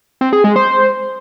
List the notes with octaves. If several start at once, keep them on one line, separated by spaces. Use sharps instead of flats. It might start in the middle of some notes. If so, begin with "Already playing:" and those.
C4
G#4
G#3
C5